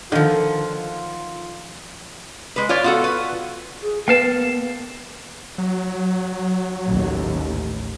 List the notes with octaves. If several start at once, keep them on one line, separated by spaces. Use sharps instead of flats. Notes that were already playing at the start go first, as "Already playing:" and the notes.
D3 D#3 F3 F4
G#3 B4
F4 C#5 D5
B3 F4 F#4 A4
B4
G#4
A#3 B3 B4 F5 G5 A5
F#3
A1 D#2